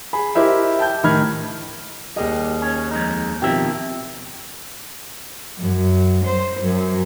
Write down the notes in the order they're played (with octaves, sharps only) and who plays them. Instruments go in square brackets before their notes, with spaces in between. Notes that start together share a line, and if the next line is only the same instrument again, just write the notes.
[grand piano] G#4 B5
E4 G4 A#4 C5 D#5 E5
G5 A5 G6
A2 D#3 B5 F6 G#6
[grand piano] D#2 G#4 D#5 [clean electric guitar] G3
[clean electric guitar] C#4
F2 G#3 D#4
[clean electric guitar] B2 D#3 E5 [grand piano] F3 C4 G4
[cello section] F#2
C5
F#2